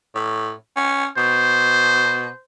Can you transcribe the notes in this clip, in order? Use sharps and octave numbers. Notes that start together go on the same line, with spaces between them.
A2
C#4
B2 C5